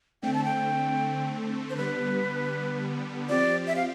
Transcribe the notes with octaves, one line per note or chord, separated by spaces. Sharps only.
D3 A3 C4 G5
A5
G5
C5
D3 G3 B3 B4
F3 C4 G4 D5
E5
F5